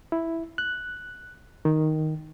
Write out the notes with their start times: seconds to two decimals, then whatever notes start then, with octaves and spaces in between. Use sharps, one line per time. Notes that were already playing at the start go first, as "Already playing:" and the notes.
0.12 E4
0.58 F#6
1.65 D#3